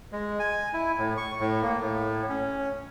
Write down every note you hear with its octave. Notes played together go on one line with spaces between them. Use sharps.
G#3
G#5
E4
A2
C#6
A2
A#3
A2
C#4